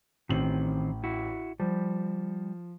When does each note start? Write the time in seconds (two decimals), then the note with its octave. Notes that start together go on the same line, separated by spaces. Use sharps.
0.29 A1 D#3 C4 F#7
1.04 E4 F#4
1.60 F3 G3